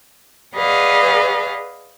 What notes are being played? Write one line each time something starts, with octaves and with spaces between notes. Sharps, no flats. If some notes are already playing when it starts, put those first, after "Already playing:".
G#4 B4 D5 D#5 F5 F#5